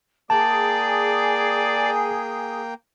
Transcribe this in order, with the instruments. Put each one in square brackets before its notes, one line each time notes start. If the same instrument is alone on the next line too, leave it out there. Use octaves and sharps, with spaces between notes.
[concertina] A#3 G5 [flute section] G#4 [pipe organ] D5 [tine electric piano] A5